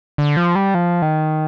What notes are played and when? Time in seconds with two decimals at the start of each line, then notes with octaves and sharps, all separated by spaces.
0.18 D3
0.37 F3
0.55 G3
0.74 F3
1.02 D#3